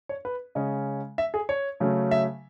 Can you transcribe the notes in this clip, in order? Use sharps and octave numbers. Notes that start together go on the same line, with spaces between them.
C#5
B4
C#3 G#3 C#4 D#5
E5
G#4
C#5
C#3 F#3 A3 C#4
E5